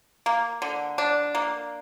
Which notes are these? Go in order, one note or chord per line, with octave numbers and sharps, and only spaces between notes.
A#3
D3
D4
A#3